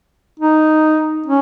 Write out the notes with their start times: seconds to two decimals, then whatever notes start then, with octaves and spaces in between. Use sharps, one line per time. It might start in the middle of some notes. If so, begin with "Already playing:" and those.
0.40 D#4
1.26 C#4